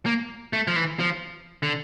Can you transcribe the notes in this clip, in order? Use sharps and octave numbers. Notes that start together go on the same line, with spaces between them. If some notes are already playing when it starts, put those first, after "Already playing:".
A#3
A3
F3
E3
F3
D3